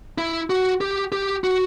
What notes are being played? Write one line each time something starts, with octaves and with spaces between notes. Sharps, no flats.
E4
F#4
G4
G4
F#4